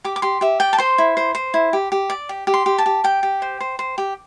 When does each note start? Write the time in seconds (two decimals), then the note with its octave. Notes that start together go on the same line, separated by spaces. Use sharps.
0.04 G4 D6
0.16 D6
0.22 G4 C6
0.41 G4 E5
0.60 D5 G5
0.73 A5
0.78 C5 C6
0.98 E4
1.17 C5
1.35 C5
1.54 E4
1.73 G4
1.92 G4
2.10 D5
2.29 G4
2.47 G4
2.54 C6
2.66 G4
2.78 A5
2.86 G4
3.04 G4 G5
3.23 G4
3.42 C5
3.60 C5
3.79 C5
3.98 G4